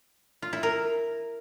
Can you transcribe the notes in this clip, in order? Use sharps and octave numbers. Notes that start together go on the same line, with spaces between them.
F4
E4
A#4